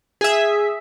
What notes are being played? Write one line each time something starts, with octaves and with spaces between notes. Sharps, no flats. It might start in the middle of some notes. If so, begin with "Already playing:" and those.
G#4 E5